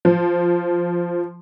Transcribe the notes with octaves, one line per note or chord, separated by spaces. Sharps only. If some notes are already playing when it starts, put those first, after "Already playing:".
F3